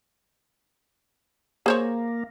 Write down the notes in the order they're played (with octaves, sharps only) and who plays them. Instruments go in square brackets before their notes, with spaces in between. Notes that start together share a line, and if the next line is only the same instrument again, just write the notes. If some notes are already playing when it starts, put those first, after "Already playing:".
[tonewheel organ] A#3 [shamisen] G#4 C5 C#5